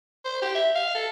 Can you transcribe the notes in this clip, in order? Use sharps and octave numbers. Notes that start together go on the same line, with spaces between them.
C5
G4
E5
F5
A4